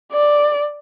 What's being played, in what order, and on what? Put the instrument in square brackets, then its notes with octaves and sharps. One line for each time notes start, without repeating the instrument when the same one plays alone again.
[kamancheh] D5